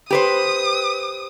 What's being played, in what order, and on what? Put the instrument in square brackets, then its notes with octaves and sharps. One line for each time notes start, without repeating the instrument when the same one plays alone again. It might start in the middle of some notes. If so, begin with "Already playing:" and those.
[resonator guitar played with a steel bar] G4 B4 C5 [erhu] D#6